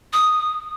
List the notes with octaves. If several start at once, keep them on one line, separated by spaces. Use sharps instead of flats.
D#6